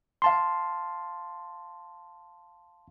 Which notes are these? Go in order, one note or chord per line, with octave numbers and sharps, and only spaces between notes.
F5 A5 C6